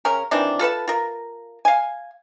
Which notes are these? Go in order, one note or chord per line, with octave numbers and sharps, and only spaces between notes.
C#3 C#4 A#4
D#3 E3 C4 D4
F4 A4 B4 A5
F4 A#4
F5 G#5